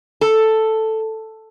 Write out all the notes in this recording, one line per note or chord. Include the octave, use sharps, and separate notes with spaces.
A4